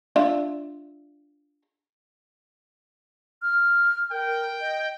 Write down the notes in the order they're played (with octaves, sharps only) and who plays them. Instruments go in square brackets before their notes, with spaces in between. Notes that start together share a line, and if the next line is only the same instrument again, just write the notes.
[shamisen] D4 F4 E5
[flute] F6
[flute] A#4 [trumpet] G5
[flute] D#5